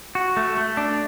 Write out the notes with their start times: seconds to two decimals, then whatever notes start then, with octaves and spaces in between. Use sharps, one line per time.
0.15 F#4
0.37 A3
0.58 A3
0.77 D4